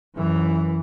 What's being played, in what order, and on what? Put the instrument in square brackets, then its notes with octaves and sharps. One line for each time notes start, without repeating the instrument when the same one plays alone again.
[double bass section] F#2 E3